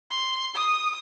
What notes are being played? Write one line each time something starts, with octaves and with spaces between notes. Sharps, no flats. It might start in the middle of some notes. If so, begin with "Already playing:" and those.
C6
D#6